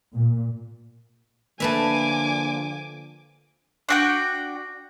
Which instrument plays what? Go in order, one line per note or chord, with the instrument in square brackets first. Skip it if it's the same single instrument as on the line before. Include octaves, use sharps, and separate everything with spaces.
[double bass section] A#2
[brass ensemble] D3 F3 [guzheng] A3 B4 E5 [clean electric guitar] A#3 [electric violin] G#5 D6
[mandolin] D4 F#4 G5